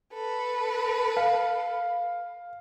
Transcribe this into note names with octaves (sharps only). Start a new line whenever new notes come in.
A4 B4
F5